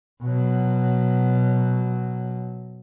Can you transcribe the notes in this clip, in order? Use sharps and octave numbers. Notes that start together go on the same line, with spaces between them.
B2 F#3